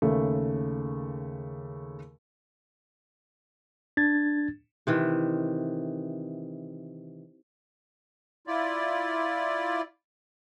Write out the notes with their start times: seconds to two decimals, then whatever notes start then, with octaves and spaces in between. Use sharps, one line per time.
0.02 D#2 C#3 A3
3.97 D4 G#6 A6
4.87 C3 D#3 E3
8.47 E4 F4 D5